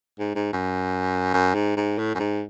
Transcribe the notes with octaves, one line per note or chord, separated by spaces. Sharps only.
G#2
G#2
F#2
F#2
G#2
G#2
A2
F#2
G#2